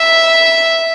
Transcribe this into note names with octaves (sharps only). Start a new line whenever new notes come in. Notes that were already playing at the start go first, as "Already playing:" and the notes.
Already playing: E5